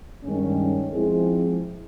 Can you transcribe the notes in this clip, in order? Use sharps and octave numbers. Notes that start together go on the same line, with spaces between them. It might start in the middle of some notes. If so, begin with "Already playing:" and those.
G2 D#3 G#3 C#4
F3 G#3 C4 E4 G#4